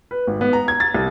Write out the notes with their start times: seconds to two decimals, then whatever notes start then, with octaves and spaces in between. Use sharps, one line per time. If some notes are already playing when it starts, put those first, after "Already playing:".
0.11 B4
0.27 G#1
0.41 B3
0.53 A#5
0.68 G#6
0.80 A6
0.95 C2